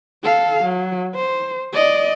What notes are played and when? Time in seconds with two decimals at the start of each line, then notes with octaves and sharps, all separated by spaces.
0.24 A4 F5
0.64 F#3
1.15 C5
1.73 D5 D#5